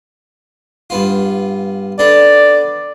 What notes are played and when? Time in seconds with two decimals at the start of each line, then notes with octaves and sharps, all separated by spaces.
0.90 G2 B3 F4
1.99 B3 D4 A4 D5